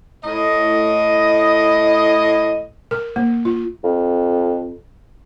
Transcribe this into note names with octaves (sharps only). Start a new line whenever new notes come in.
A2 D#5
A#4
A#3
F4
F2